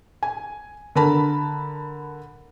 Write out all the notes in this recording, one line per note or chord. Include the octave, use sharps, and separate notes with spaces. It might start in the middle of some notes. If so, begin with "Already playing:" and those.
G#5
D3 A#4 A5 B5